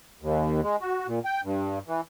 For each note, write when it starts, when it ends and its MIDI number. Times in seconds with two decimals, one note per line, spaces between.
0.22 0.61 39
0.63 0.76 56
0.81 1.07 66
1.08 1.19 46
1.25 1.41 79
1.44 1.79 43
1.88 2.01 52